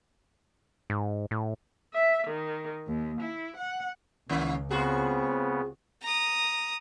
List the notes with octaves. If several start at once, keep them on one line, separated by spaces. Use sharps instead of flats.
G#2
A2
E5
D#3
D#2
E4
F#5
C#2 D#3 A#3 C#4
C#3 B3 C4 F4 F#4 G#4
A#5 D#6